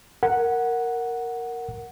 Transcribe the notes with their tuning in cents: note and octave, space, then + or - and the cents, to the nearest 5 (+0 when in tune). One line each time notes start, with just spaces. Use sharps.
A#4 -5 F#5 +0